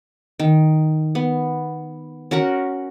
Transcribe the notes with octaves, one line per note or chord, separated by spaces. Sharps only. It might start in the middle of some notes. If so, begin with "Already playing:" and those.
D#3
B3
C#4 F#4 A#4 F#5